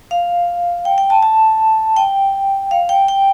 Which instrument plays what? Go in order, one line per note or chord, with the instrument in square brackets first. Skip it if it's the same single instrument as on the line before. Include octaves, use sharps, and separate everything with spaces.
[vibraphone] F5
G5
G5
A5
A5
G5
F5
G5
G5